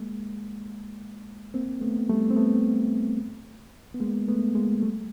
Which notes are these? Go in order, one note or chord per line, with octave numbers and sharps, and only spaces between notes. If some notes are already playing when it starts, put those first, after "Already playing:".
Already playing: G#3 A#3
A#3 C4
A3 B3
G3 A3
C4
A3 B3
B3
G#3 A#3
A3 B3
G#3 A#3
G3 A3